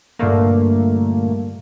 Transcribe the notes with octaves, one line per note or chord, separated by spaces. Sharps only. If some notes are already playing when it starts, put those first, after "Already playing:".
G2 A#2 D3 A3 A#3